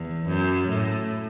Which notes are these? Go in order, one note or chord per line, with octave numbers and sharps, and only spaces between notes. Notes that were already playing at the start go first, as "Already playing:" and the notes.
Already playing: E2
F#2
A2